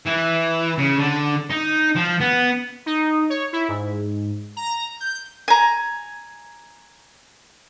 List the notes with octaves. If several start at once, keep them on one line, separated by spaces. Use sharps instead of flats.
E3
C#3
D3
D#4
F3
B3
D#4
C#5
E4
G#2
A#5
G6
G#5 A#5